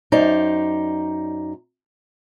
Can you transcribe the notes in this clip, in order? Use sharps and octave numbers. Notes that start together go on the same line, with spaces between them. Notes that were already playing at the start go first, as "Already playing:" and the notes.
F#2 D#4 C5 D5 A#5